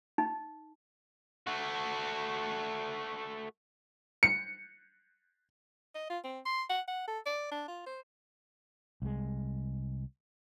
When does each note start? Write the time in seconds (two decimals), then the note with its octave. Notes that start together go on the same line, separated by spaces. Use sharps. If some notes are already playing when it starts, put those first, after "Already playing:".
0.18 D#4
1.47 A3 F#4
4.23 C#7
5.95 D#5
6.10 F4
6.24 C4
6.46 C6
6.70 F#5
6.88 F#5
7.08 A4
7.26 D5
7.52 D4
7.68 F4
7.86 C5
9.02 C2 G#3